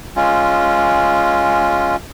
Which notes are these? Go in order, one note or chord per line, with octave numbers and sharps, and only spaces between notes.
G#3 C#4 F4